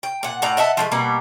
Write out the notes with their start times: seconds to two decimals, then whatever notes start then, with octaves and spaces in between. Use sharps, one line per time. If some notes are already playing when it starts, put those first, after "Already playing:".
0.03 G5
0.23 A#2 F#5
0.42 A2 D5 F#5 A#5
0.57 D#5 E5 F#5 A5
0.77 F3 G#3 A3
0.92 B2 G3 A#3 B3